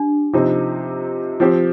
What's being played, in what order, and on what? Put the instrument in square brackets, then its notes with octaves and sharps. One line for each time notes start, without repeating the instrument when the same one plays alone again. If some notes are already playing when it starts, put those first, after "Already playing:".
Already playing: [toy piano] D4 [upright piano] G4
[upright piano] C3 F3 C4 D#4
F3 C4 G4